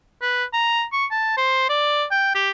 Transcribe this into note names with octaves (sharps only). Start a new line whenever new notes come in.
B4
A#5
C#6
A5
C5
D5
G5
G4